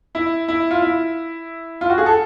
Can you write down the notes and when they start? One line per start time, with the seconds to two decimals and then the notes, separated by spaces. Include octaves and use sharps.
0.15 E4
0.48 E4
0.71 F4
0.82 E4
1.81 F4
1.90 F#4
1.98 G#4
2.06 A4